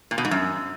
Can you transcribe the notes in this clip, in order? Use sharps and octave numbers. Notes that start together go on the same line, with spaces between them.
A#2
B2
G#2
F#2